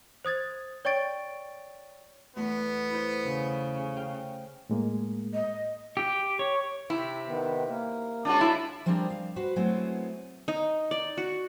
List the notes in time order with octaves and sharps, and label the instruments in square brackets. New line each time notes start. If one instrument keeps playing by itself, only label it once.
[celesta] C5 D#6 G#6 A6
C#5 D5 G5 C#6 A6 D7
[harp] E2 A3 [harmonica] B3
[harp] E4 C5
[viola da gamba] C#3
[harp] F5 G5
[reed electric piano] A2 G#3 A#3
[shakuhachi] D#5
[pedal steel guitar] G4
C#5
[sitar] C3 [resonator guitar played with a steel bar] E4
[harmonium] D#3 B3
A#3
[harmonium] G#3 C#4 [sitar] D4 F4 F#4
[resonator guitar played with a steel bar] E4
[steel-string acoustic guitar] F3 G3 C4 D4 G#4 A#4
F5
F#4 B4 C5
F#3 G#3 A3 B3 C4 E4
[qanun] D#4
D5
F#4